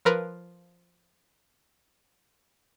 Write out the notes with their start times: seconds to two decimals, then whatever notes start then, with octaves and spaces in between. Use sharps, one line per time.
0.05 F3 A#4 B4